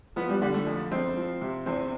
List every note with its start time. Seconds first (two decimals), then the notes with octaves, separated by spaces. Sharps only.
0.16 F3 B3
0.29 G3
0.42 D3 G3
0.54 A3
0.67 F2
0.92 F2 C4
1.17 F3
1.41 C3
1.66 E2 C4